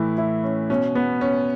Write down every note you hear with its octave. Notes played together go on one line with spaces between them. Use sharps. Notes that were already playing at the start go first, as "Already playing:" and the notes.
Already playing: A2 E3 E4
E4
C#4
B2 C#4
B3
C#4